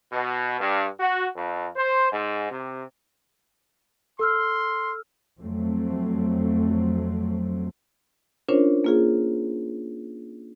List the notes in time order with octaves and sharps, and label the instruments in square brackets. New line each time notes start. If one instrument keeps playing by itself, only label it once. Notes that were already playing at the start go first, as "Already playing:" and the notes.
[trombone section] B2
G2
F#4
F2
C5
G#2
C3
[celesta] A4 E6 F6 [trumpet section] C6
[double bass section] F2 F#3 A3 C4
[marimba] C#4 D4 F4 A#4 C5 C#5
A#3 F4 G#4